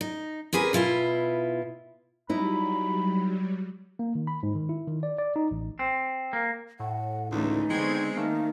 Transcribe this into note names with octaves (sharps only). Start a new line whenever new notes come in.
D#4
C4 G4 G#4 A#4 B4
B2 E4 F4 B4
F#3 G3 D#4 E4 B5
A#3
D#3
B5
G#2
D#3
E4
D#3
D5
D5
D#4
A1
C4
A#3
A2 F#5
C#2 D3 E3 A3 D#4
D3 G#3 B3 C4 G5 C#6 G#6
D#3 A3 A#3 D#4 A#4